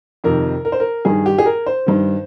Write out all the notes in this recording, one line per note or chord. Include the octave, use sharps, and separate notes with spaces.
F2 C3 D#3 A#4
A#4
C5
A#4
G2 D#3 G#4
G4
G#4
A#4
C5
G2 D#3